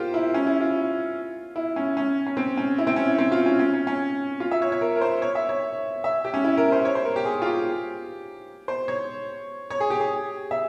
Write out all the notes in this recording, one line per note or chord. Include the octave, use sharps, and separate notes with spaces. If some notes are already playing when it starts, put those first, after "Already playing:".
Already playing: F4 G4 A#4 C5
E4
C#4
E4
F4
E4
C#4
C#4
C#4
C4
C#4
E4
C4
C#4
E4
C4
F4
C#4
C#4
C#4
C#4
F4
E5
C#5
C#5
A#4
A#4
C5
C#5
E5
C#5
E5
G4
C#4
E4
A#4
C5
C#5
C5
A#4
G4
G#4
F4
G4
C5
C#5
C#5
G#4
G4
G#4
E5